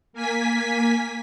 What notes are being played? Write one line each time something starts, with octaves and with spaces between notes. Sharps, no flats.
A#3 G#5 B6